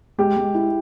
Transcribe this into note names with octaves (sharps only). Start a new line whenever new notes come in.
G#3 G4
G#3
E4